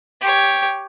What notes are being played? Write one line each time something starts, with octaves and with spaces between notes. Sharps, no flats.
G4 C#5